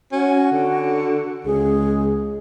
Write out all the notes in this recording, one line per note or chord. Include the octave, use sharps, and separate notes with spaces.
C#4 F#4
D3
C#2 G#4